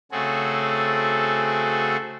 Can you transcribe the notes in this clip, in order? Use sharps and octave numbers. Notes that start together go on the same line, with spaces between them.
C#3 A3 C4 F#4 G#4 A4